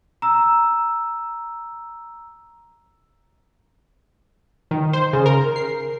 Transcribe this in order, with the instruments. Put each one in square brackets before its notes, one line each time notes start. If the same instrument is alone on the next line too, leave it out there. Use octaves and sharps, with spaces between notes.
[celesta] A#5 E6
[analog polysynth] D#3
C5
C#3
A#4
C7